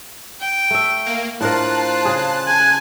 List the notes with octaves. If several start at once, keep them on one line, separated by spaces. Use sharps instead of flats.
G5
A3 E5
A#3
A2 D4 F4 A#4 C5 A5 F#6
C#3 G#4
G#5